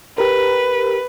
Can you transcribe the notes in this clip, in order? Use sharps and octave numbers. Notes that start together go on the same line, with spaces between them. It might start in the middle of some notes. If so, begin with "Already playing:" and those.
G4 A#4 B4